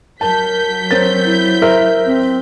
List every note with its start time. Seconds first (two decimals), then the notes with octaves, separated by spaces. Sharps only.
0.21 F#3 A#4 A5 G6 B6
0.91 C4 A#4 C#5 A6
1.25 E4
1.62 A#4 C5 E5
2.06 C4